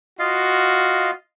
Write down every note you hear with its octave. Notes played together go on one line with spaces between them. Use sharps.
F4 F#4 D#5 F5